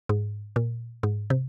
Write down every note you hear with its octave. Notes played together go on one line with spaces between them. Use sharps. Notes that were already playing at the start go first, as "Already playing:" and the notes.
G#2
A#2
G#2
C3